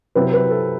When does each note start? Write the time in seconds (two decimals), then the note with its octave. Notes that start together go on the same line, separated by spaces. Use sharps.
0.15 C3 F#3 C4 E4 B4
0.34 B4
0.51 A4